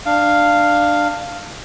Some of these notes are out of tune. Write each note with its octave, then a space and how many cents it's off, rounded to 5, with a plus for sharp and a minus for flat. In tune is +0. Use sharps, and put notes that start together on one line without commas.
D4 +20 F5 +0